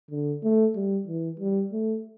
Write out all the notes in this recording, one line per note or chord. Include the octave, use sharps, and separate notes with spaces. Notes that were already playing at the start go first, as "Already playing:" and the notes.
D3
A3
G3
E3
G3
A3